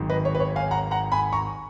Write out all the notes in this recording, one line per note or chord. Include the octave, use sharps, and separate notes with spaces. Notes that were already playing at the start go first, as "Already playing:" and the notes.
Already playing: G#1 G#2 D#3 F#3
B4 D#5
C#5
B4
C#5
F5 G#5
F#5 A#5
F#5 A#5
G#5 B5
A#5 C#6